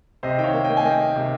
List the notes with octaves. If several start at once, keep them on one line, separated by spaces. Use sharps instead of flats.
C3 C5 D#5
D#3 G5
C#5 F5
A#3
D#5 G5
A#3
G#5
A#3 D#5 G5
A#3
C3